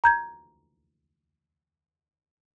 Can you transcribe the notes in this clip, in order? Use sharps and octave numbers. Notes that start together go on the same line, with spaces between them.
A#5 G6 G#6